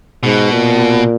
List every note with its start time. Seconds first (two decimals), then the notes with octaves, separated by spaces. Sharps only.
0.23 G#2 B2
0.52 A#2